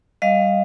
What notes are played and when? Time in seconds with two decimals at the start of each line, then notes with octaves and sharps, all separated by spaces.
0.22 G3 D#5 F5